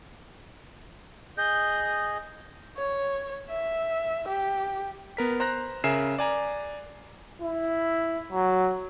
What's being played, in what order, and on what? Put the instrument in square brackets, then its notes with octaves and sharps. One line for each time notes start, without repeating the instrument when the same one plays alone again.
[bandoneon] G#4 D#5 [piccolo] G6
[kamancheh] C#5
E5
G4
[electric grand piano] B3 A#4 B6
C5 A#5 F#6 A#6
C#3 A#4 E5 G#5 C7 E7
D5 G#5 A#5
[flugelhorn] E4
F#3